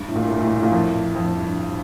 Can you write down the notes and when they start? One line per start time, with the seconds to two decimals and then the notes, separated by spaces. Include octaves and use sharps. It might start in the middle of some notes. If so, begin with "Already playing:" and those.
Already playing: G2
0.08 A2
0.16 A#2
0.24 A2
0.32 A#2
0.40 A2
0.47 A#2
0.56 A2
0.63 A#2
0.71 F2 A2
1.15 F2
1.37 G2